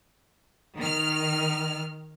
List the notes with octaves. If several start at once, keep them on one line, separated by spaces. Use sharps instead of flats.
D#3 F6